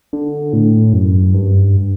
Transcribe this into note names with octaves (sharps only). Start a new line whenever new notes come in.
D3
A2
F#2
G2